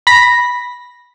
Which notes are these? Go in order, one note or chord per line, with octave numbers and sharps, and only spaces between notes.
B5 A#6 B6